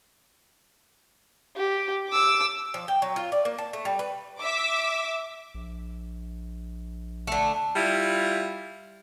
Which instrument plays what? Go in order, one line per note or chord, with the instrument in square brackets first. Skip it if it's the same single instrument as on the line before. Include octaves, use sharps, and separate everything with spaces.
[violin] G4
D6 E6
[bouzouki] F3
G5
F#3
F4
D5
A#3
A5
A3
G3
B4
[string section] E5 D6
[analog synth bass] A#1
[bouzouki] D3 A3
[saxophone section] G3 E4 F4